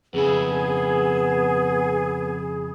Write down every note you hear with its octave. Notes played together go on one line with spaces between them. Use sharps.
F2 C#3 B3 E4 G#4